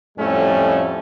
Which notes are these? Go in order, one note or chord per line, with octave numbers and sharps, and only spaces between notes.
F2 A2 G3 A3 C#4